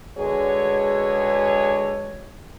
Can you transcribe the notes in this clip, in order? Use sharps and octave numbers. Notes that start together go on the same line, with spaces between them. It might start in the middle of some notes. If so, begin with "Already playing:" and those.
D3 G#3 F#4 G#4 B4 C#5